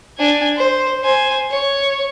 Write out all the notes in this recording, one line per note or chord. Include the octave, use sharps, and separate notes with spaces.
D4 G#5
C5
C5 G#5
C#5